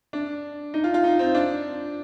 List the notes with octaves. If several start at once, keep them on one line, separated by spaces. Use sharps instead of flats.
D4
D#4
F4
F4
D#4
C4
D4